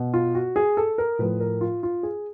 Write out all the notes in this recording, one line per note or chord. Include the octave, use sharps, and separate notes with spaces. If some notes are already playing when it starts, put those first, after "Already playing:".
Already playing: B2
F4
F#4
G#4
A4
A#4
A2 F3 B4
A#4
F4
F4
G#4